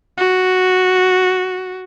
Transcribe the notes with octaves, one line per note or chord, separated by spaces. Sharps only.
F#4